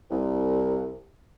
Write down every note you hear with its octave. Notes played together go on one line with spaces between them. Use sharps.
C2